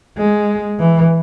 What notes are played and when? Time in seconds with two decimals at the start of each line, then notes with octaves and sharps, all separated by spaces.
0.17 G#3
0.79 E3